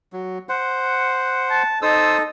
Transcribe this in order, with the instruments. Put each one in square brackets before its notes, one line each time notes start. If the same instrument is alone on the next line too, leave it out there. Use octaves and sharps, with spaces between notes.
[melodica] F#3
C5 F#5
[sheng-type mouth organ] A5
[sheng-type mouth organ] D#4 A4 [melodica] C5 D#6 E6